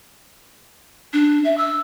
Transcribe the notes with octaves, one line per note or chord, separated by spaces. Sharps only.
D4
E5
E6